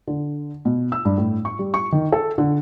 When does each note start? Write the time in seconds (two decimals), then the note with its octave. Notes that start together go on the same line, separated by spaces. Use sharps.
0.07 D3
0.65 B2
0.92 E6
1.05 G2
1.18 A2
1.45 C#6
1.59 G3
1.74 C#6
1.92 D#3
2.12 A4
2.38 D3